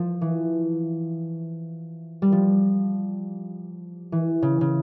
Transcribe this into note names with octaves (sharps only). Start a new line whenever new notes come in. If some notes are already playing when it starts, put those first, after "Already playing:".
Already playing: F3
E3
G3
F3
E3
C#3
C#3